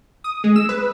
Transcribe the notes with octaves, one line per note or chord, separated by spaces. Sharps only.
D#6
G#3
E6
B4